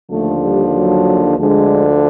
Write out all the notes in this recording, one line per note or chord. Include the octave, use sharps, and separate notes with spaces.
D#2 D3 F3 A3
G3
F#3
D2 D3 F3 G#3